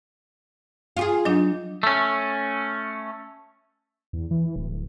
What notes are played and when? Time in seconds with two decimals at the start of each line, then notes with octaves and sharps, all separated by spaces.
0.97 F4 G4 G#4
1.25 F#3 D4 D#4
1.83 A3 C#4
4.13 E2
4.31 E3
4.56 D1